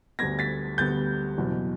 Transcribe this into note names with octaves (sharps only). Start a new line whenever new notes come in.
D2 D3 G3 B3 G#6 A#6
A6 B6
D2 D3 G3 B3 G6 A6
F#1 E2 B2